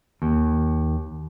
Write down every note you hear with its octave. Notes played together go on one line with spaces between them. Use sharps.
D#2